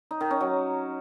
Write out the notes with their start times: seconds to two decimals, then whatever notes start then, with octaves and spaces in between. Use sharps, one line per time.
0.11 D#4
0.21 D#3
0.31 C#4
0.41 F#3